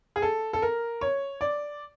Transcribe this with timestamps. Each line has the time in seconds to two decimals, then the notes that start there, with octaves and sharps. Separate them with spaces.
0.16 G#4
0.22 A4
0.53 A4
0.62 A#4
1.01 C#5
1.41 D5